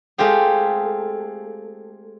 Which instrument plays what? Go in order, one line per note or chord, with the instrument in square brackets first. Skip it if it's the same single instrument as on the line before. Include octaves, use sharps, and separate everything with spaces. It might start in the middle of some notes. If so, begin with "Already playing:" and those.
[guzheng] G#3 A3 C4 F4 G4 G#4